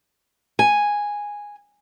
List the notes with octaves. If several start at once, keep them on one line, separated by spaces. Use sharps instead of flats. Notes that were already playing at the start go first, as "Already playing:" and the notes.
G#5